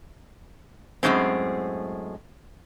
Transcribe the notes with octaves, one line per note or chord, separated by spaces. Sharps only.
F#2 A2 C#3 G#3 C4